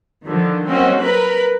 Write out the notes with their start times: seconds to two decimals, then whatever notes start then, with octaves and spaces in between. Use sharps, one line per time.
0.24 D3 D#3 F3
0.66 F#3 A#3 C4 C#4 F#4 D#5
1.02 A#4 B4 B5